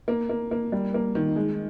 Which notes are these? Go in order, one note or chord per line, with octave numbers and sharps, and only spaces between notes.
A#3
A#3
A#3
G3
A#3
D#3
G#3